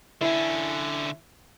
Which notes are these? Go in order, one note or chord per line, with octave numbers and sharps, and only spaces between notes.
D3 C#4 E4